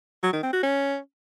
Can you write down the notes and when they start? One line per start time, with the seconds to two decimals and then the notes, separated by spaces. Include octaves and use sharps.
0.23 F#3
0.33 D#3
0.43 C4
0.53 F#4
0.63 C#4